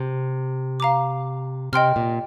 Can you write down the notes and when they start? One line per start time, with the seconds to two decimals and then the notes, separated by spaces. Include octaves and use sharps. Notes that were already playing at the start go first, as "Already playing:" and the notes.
Already playing: C3
0.80 F5 A#5 D6
1.73 C3 D#5 G5 C6 F6
1.96 A#2